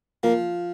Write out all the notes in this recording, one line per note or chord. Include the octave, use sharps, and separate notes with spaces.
F3 A#3